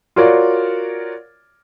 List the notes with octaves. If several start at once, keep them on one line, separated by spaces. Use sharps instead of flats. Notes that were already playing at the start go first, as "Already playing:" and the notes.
F4 F#4 A#4 C#5 D5